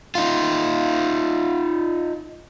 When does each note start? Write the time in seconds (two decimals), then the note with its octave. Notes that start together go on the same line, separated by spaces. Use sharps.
0.15 D#4 F4